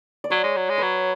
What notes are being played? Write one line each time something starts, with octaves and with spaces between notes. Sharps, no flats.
D5
F#3 C#5
G#3
F#3
G#3
F#3 B4